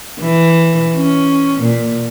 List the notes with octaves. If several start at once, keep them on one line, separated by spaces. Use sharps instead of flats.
E3
C#4
A#2